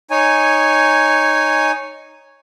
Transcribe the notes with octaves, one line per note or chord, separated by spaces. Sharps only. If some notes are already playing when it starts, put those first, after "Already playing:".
D#4 C#5 G#5